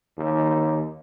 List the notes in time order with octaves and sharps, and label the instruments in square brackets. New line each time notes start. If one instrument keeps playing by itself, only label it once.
[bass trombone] D#2